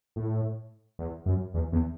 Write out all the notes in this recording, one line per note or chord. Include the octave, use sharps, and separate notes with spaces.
A2
E2
F#2
E2
E2